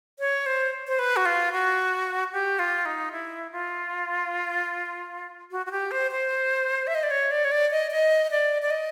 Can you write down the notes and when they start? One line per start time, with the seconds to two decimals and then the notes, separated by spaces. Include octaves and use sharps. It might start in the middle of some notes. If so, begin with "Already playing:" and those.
0.19 C#5
0.46 C5
0.87 C5
0.99 B4
1.16 F#4
1.26 F4
1.52 F#4
2.32 G4
2.59 F4
2.86 D#4
3.12 E4
3.52 F4
5.51 F#4
5.66 F#4
5.71 G4
5.91 C5
6.11 C5
6.87 E5
6.95 D#5
7.03 D5
7.11 C#5
7.31 D5
7.44 C#5
7.52 D5
7.71 D#5
7.91 D#5
8.31 D5
8.62 D5
8.71 D#5